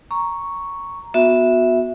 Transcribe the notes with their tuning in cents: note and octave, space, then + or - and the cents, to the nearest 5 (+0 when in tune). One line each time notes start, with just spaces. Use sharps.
A#5 +0 C#6 +0
B3 +0 F#4 -20 E5 +0